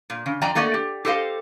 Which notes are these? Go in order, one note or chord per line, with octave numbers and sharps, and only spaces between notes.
A#2
C#3
F2 D5 D#5 G5 A#5
A3 A#3 F#4 D5 D#5
G4
G4 A4 C5 D#5 F5